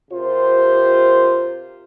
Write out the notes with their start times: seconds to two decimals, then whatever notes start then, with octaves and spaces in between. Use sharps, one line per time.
0.11 C3 F4 G4 A#4 C5